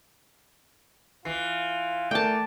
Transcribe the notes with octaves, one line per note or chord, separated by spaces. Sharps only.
E3 F4 C7
A3 A#4 D5 G5 A5